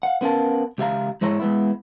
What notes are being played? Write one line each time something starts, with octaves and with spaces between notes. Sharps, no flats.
F5 F#5
B3 C#4 A#4 F5 A5
C#2 G4 E5 F5 A#5
G#2 G#3 E4 C#5 A#5
G#3 B3 E4